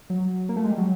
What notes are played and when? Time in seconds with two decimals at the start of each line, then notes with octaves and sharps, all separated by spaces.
0.10 F#3
0.49 A#3
0.56 A3
0.64 G#3
0.71 G3
0.78 F#3